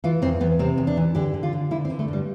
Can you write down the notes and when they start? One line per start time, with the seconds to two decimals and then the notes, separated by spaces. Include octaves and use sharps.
0.04 E3 F4
0.22 E2 C4
0.40 E2 B3
0.59 C3 C4
0.78 E2
0.87 D4
0.97 E3
1.15 D3 G4
1.34 D3
1.43 F4
1.53 D3
1.71 D3 E4
1.85 C4
1.90 D3
1.99 A3
2.08 G2 G3